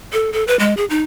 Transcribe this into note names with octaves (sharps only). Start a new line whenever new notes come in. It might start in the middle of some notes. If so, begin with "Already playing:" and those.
A4
A4
B4
G#3
G#4
D#4